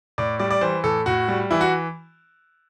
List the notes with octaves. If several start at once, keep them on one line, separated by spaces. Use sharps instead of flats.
A2 D5
G3 D5
D5
E3 C5
A2 A4
A2 F#4
G3
E3 E4
F#4